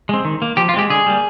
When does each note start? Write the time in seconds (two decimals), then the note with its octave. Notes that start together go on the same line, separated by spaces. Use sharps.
0.09 G#3 C4
0.25 D#3
0.42 A#3
0.57 F3 G4
0.69 F4
0.74 G#3 C4 G4
0.90 D3 G#4
1.06 G3 A#3